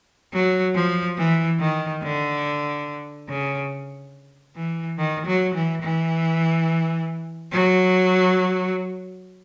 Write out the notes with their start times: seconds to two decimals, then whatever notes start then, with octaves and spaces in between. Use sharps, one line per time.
0.33 F#3
0.75 F3
1.18 E3
1.60 D#3
2.03 D3
3.29 C#3
4.56 E3
4.98 D#3
5.26 F#3
5.55 E3
5.83 E3
7.52 F#3